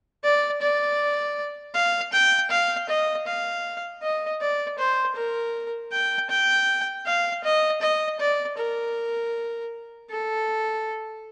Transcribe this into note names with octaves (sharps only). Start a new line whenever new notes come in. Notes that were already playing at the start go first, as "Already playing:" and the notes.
D5
D5
F5
G5
F5
D#5
F5
D#5
D5
C5
A#4
G5
G5
F5
D#5
D#5
D5
A#4
A4